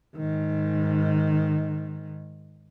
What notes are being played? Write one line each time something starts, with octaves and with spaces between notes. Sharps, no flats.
G#2 D#3